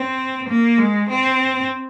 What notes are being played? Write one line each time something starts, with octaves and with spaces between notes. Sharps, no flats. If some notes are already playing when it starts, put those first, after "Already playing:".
Already playing: C4
A#3
G#3
C4